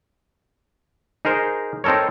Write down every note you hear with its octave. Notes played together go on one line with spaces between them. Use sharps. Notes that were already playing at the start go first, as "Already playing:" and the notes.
D#4 G#4 A#4 C5
C4 D#4 A4 A#4 C#5